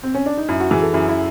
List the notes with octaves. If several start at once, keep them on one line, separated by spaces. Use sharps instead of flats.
C4
C#4
D4
D#4
F#2 E4
F#4
E3 G#4
A4
F#2 E4
E4